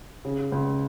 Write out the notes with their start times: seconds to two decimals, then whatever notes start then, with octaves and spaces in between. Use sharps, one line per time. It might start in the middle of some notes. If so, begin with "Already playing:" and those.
0.25 C#3
0.52 C#2